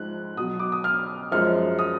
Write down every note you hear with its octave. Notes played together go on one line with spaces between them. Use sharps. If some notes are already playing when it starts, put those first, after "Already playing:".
Already playing: G#2 F3 G#3 F#6
B2 F#3 D#6
D6
D#6
F6
F#2 F3 G#3 F6
D#6